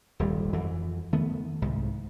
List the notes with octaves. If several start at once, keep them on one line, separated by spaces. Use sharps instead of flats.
D#1 G#1 G3
F2 E3
D#3 A3 B3
C2 G#2